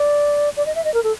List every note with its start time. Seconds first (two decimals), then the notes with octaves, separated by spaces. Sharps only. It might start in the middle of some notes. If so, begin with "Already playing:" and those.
Already playing: D5
0.57 D5
0.66 D#5
0.75 E5
0.84 D#5
0.94 A#4
1.04 A4